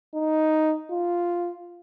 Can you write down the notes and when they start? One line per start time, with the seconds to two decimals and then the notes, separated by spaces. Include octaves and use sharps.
0.15 D#4
0.91 F4